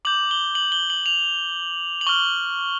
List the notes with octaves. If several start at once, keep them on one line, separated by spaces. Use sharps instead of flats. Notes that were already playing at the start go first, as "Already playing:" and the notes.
D6 G6 F#7
G7
F#7
G7
F#7
F7
F#7
C#6 F6 G7